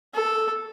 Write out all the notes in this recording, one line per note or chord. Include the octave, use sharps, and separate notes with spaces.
A4